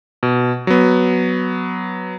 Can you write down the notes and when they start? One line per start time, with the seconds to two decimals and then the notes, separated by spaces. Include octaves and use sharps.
0.23 B2
0.67 F#3 B3